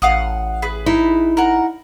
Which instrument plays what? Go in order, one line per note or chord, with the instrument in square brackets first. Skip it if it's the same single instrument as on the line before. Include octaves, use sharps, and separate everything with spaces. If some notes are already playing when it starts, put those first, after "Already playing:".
[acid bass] A1 [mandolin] F5 F#5 D#6
[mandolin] G#4 B4
[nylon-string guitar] D#4 E4
[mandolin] A#4 F#5